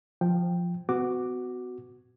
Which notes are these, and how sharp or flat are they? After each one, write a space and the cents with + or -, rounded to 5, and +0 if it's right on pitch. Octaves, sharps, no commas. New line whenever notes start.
F3 +5 G5 +0
B3 +35 F#4 +0 D6 +5